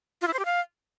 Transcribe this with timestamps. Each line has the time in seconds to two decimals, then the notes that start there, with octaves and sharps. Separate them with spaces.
0.22 F4
0.28 E4
0.33 C5
0.39 G4
0.45 F5